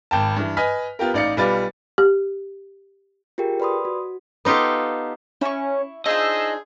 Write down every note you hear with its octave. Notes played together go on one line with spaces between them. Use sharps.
G#1 G5 A5
G2 E3
B4 D#5 G#5 B5 F6 B6
B3 F4 G4 A#4
A1 D#4 D5 F5 C#7
B1 G3 F4 B4 D5 A6
G4
F4 G4 G#4 A#4 G5
B4 D5 B5 C6 D#6
F#4
B3 D#4 F4 G4 A4
C#4 E4 C#6
D4 D#4 F4 G#4 C5 D#5 E6